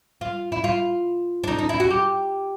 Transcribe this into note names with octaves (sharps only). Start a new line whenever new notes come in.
F4
E4
F4
D4
D#4
D#4
E4
F#4
G4